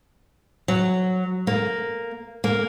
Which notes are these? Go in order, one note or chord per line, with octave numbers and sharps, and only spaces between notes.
F#3
A#3
A#3